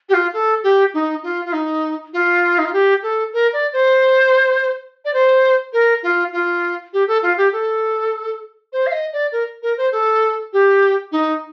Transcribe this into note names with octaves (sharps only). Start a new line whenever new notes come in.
G4
F4
A4
G4
D#4
F4
F4
D#4
F4
D#4
F4
G4
A4
A#4
D5
C5
D5
C5
A#4
F4
F4
G4
A4
F4
G4
A4
C5
F5
D#5
D5
A#4
A#4
C5
A4
G4
D#4